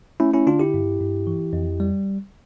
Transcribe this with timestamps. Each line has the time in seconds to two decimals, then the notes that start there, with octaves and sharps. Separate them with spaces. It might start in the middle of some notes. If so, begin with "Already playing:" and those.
0.20 A3 C#4 E4
0.34 C#4 E4
0.47 D3 D4 F4
0.60 E4 G4
0.74 G2
1.00 G2
1.27 E3
1.53 F2
1.80 G3